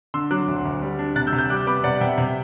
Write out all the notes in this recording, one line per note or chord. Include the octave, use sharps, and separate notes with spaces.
D3 C6 E6
F#3 D6 F#6
D2
D2
G3
D4
C3 F#6 A6
E6 G6
C3
E6 G6
G3 D6 F#6
B3 B5 D6
C3 D5 F#5
C3 E5 G5
C3